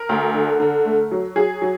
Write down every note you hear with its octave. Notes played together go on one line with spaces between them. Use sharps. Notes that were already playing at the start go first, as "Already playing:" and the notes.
Already playing: A#4
D2
D3
D3
A3
F#3
F#3 G#4
F#3